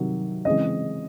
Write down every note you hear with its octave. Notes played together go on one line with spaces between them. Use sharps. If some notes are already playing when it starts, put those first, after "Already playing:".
Already playing: C3 D#3 F#3
C#3 E3 G#3 C4 D#5